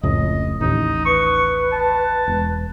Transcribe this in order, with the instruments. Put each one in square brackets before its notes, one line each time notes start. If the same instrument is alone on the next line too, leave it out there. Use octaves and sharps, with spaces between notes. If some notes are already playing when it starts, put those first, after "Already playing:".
[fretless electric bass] F1 C#2 A2 [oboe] D#5
[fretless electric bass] A1 D#2 [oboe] D#4
[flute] B4 [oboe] C#6
[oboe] A5
[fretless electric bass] E1